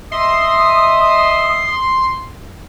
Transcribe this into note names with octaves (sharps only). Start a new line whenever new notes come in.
D#5 E5 C6 D#6